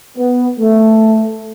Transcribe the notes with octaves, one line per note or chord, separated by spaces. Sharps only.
B3
A3